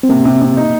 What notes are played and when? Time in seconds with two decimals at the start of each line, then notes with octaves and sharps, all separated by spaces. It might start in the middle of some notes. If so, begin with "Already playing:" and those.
0.03 C4
0.09 C3 A#3
0.25 C3
0.42 C3
0.57 D#4